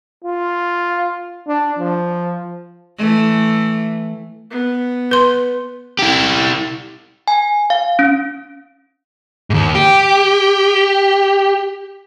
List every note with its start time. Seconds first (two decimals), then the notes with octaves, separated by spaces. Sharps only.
0.25 F4
1.47 D4
1.79 F3
2.98 E3 A3
4.51 B3
5.11 B4 C6
5.99 E4 G4
7.28 G#5
7.70 F5
7.99 C#4
9.50 D#2 G#2
9.75 G4